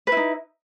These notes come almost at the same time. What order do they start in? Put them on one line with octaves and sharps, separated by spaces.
B4 E4 D#4